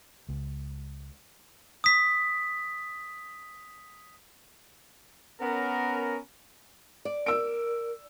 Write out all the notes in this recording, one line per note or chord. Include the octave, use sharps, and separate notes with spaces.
C#2
D#6 B6
B3 C#4 A#4
D5
A#4 E6 D7